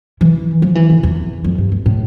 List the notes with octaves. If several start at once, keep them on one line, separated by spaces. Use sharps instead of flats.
E3
F3
E3
D3
E2
F2
G2
G2
A2